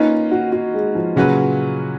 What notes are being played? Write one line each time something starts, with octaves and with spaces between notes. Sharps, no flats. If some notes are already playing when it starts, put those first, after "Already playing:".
Already playing: A#3 C#4 D#4 F4 B4
F#4
F#4
G#3
F3
A#2 C#3 F#3 C#4 F#4 B4